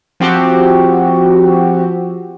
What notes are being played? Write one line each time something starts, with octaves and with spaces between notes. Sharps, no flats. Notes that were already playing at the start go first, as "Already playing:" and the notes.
F3 C4 F#4 G4